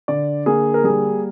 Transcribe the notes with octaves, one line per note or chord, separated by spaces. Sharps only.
D3 D5
A#3 G#4
A#4
G3 G#4